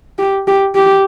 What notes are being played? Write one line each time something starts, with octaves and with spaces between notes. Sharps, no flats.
G4
G4
G4